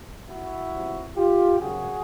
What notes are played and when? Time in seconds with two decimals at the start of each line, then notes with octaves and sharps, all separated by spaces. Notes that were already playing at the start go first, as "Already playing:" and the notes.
0.27 E4 F#4
0.71 F2 C3 E3 G3
1.15 F4 G4
1.58 G#1 F#2 C#3 F#4 G#4